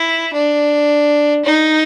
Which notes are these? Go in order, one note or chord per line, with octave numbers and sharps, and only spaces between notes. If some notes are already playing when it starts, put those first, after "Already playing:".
Already playing: E4
D4
D#4